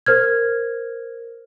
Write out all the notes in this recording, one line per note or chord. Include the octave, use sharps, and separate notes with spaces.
A#4 C5 F6 G#6